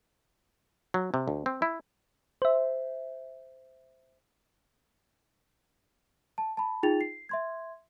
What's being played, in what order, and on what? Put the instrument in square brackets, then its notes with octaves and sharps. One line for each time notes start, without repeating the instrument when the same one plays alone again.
[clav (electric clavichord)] F#3
C3
D2
C4
E4
[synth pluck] C5 E5
[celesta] A5
A5 B5
D#4 F4 G#4 G5 A6 F7
C7
E5 C6 G#6